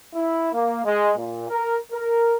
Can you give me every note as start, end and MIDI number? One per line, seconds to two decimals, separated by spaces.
0.14 0.53 64
0.53 0.83 58
0.85 1.11 56
1.16 1.44 46
1.50 1.76 70
1.92 2.35 70